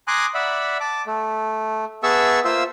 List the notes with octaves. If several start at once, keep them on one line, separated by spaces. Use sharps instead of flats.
G#5 A#5 C6 D6 D#6 F#6
D5 E5 F#5 B5
A5 D6
A3
B3 G#4 E5 A5 C#6 E6
A#3 F4 C5 E5 E6